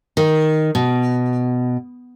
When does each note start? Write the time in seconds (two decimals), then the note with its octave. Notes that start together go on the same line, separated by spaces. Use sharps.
0.17 D#3
0.75 B2